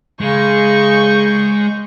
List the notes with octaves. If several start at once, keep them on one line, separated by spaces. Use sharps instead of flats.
C#3 G#3 C#6 G6